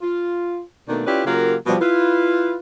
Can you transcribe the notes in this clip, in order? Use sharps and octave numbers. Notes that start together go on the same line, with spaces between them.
F4
B2 D#3 A3 A#3 D4
C#4 E4 F4 G4 B4 D5
C#3 F#3 A#3 F4 G4 A#4
B2 F3 G3
E4 F4 B4